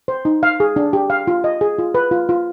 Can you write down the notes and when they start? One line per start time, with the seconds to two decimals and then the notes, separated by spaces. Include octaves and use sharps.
0.08 C5
0.25 D#4
0.43 F5
0.60 G#4
0.76 D4
0.93 G4
1.10 F5
1.27 F4
1.44 D#5
1.61 G#4
1.78 F4
1.94 B4
2.11 F4
2.29 F4